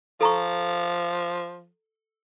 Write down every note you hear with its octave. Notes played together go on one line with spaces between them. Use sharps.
F3 A4 A#5 C#6